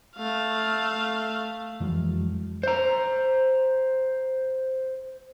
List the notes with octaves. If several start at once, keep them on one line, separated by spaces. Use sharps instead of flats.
A3 F5
F2 E3 F#3 G#3
C5 A#5